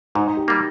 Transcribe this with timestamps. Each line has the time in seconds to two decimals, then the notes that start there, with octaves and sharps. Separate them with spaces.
0.15 G#2 D#4
0.37 G4
0.48 G3 A#3